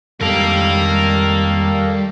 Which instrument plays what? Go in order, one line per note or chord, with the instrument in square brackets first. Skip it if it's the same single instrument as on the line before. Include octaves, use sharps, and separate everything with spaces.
[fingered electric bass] F2 G#3 [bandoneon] D#3 A4 [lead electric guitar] G3 [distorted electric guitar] A#4 F5